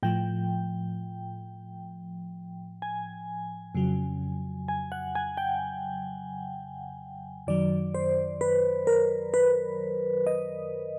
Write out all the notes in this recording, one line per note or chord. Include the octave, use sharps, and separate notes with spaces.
A2 F3 G5
G#5
F2 C#3 F#3
G#5
F#5
G#5
G5
F#2 D#3 F#3 D5
C5
B4
A#4
B4
D#5